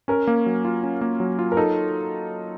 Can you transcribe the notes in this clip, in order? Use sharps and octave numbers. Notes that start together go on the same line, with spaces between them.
C#4 A#4
A#3
F#3
F4
C#4
A#3
F#3
F4
A#4
D#4 A4